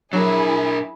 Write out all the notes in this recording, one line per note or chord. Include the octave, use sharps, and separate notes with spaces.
F#3 D4 E4 G#4 A#4 G#5